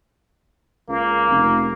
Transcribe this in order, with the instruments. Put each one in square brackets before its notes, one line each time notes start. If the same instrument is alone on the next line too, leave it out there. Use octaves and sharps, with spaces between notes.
[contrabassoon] C#2 [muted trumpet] A#3
[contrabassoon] F1